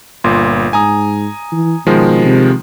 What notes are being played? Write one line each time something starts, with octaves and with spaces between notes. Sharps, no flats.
G1 A#2 C6
G#2 G#5 A#5 D#6
E3
B2 D#3 F3 G#3
C3